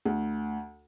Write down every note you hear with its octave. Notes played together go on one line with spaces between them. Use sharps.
D2